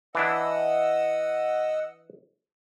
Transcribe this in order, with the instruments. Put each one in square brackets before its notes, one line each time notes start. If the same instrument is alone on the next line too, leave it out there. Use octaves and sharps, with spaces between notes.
[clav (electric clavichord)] E3 D4 E4 [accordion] D#5 F#5 E6